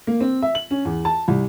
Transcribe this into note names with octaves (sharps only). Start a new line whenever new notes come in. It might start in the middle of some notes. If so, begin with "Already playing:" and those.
A#3
C4
E5
F#7
C#4
E2
A5
C2